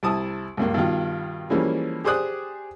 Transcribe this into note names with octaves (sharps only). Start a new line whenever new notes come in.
C2 E4 A5 D#6
C#2 G2 A#3
G2 B2 D#3 F4
E3 F3 G3 G#3 A#3 C#4
G4 G#4 C5 D5 D#6 F#6